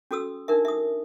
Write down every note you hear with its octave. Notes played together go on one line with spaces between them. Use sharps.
C#4 F#4 A4 D#6 E6
D4 D#4 A#4 E5
E5 D#6